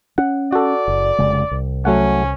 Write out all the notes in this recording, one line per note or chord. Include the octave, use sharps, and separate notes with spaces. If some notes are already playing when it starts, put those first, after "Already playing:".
C#4 F#5
F#4 A4 D5
F#1
F1 C#3 G#3
C2
F#3 A3 C#4 F#5